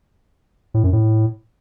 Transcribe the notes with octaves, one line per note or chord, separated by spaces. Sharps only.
A2
F#2
A2